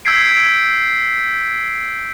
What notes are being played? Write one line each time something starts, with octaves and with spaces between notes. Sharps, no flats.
E6 G6 G#6 B6 C7 D7